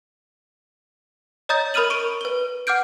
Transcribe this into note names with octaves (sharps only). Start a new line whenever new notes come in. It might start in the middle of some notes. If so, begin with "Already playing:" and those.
C#5 D#5 A#5 D#6 G6 A6
A#4 B5 D#6 F6 D#7 F#7
C#6 D7 D#7
B4 G7
F#5 D6 F6 G6 D7